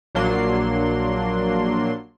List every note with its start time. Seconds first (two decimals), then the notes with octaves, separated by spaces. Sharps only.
0.15 A#1 F#3 A#3 D4 C6